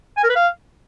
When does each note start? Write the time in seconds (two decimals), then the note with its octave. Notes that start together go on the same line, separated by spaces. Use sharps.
0.17 G#5
0.23 A#4
0.29 B4
0.36 F5